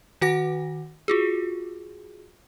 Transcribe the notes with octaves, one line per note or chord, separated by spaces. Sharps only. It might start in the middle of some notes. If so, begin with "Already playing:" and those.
D#3 F#4 F#5 A#6
F4 F#4 G#4